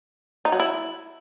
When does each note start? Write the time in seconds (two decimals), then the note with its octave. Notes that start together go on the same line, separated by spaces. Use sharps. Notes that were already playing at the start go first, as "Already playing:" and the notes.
0.45 D#4
0.52 F#3
0.60 E4